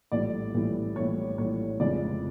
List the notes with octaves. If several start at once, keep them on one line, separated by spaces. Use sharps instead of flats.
A#1 A2 E3 G3 D5
A#1 A2 E3 G3
A#1 A2 E3 G3 C#5
A#1 A2 E3 G3 C#5
F1 F2 C#3 E3 G#3 D5